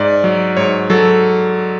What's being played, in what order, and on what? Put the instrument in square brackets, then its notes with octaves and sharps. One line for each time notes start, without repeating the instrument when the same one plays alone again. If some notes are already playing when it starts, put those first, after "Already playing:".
Already playing: [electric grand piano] G#2 D5
F#3
G#2 C#5
F#3 A4